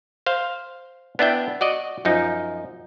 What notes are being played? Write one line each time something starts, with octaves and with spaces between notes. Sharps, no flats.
C5 F5
B3 D4 E4 E5 G5
F#4 D5 D#5
F#2 F3 D#4